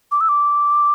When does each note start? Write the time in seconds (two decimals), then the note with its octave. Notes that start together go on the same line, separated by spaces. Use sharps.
0.12 D6
0.21 E6
0.29 D6